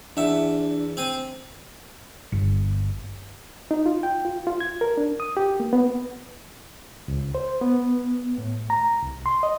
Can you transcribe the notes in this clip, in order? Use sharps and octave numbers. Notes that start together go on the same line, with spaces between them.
E2 D4 E5
C4 G#5
G1
D#4
F4
G5
F4
F4
G#6
A#4
D4
D#6
G4
A#3
B3
C#2
C5
B3
A2
A#5
C2
C6
D#5